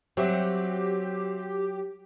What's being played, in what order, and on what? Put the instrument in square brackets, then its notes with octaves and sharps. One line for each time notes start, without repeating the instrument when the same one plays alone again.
[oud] F#3 [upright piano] C4 E5 [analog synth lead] G4